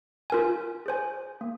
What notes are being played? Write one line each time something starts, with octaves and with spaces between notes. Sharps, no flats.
F4 A#4 G#5
G#4 C5 G#5
A#3